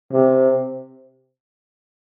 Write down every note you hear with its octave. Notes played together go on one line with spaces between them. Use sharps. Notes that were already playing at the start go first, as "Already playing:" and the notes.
C3